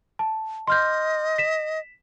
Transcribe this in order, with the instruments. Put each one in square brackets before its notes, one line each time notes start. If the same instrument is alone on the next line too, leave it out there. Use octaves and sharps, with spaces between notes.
[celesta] A5
[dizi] D#5 [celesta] C6 F6 G6
[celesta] B6 E7